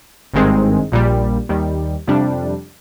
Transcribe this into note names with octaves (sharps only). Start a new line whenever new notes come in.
G#1 G2 D#3 G#3 C4
A#1 A#2 G3
D#2 D#3 G3
F2 C3 G3 D4